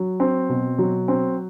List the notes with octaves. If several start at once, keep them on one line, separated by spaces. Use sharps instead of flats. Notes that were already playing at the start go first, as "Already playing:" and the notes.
Already playing: F#3
C4
B2
F#3
C4